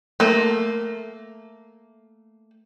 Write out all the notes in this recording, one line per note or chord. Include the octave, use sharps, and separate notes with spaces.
A3 A#3